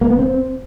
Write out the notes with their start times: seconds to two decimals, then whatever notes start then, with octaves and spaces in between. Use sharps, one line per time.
0.01 A#3
0.10 B3
0.19 C4